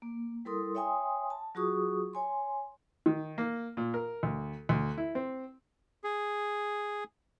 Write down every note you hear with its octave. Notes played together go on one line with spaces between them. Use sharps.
A#3
G3 E4 A4 A#4 C6 D#6
C#5 E5 G5 G#5 C6 D#6
A5
F#3 F4 F#4 G#4 C#6 D#6
C#5 G#5 C6
D#3
A#3
A#2
A#4
D2
D2
E4
C4
G#4